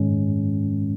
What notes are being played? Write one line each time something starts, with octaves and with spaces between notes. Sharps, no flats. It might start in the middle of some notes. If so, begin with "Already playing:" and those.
Already playing: G#2 D#3 G#3 C#4